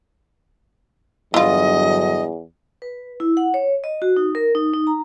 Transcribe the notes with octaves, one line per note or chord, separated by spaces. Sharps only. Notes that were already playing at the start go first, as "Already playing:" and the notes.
E2 G2 D3 F#3 E4 F4 D#5
B4
E4
F#5
C#5
D#5
F#4
D#4
A#4
D#4
D#4
A#5